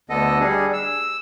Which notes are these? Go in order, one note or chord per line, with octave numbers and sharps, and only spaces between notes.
D2 D3 B3 A4 D#5
G3 D4 G#4
E6